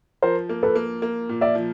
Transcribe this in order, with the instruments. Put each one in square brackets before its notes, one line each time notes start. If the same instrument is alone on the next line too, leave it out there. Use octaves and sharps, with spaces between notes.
[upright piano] F3 [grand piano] A#4 C5
[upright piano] A#3
[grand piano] A4 B4
[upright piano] A#3
A#3
A#2
[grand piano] D5 E5
[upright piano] F3